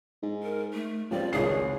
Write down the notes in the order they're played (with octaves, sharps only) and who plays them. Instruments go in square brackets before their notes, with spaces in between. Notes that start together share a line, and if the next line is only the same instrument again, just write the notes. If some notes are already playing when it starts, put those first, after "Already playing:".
[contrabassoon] G#2
[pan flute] A#4
A3
[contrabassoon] C#2 [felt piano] F3 G3 C4 [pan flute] D5
[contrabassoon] G#1 [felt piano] C#2 C#4 C7 [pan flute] G#4